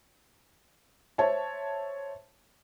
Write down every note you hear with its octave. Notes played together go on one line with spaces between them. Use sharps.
C5 C#5 E5 A5